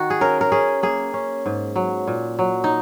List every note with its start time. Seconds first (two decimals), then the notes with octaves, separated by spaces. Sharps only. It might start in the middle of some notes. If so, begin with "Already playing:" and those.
Already playing: D#3 F#4
0.10 G#4
0.21 C#4 A#4
0.41 A#4
0.52 C#4 G#4
0.83 A#3 G#4
1.14 C#4
1.46 G#2
1.76 F#3
2.07 A#2
2.39 F#3
2.64 D#4